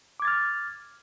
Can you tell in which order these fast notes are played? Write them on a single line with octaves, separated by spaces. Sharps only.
D6 G#6 A6 F6